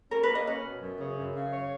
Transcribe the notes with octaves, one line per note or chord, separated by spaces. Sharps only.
C#4 A#4
B4
A#3
D#5
C#4 B4
B2
F#2
C#3
F#2
C#3
C#5